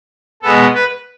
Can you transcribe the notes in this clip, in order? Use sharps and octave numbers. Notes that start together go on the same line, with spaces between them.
B2 G#3 B3 A4
B4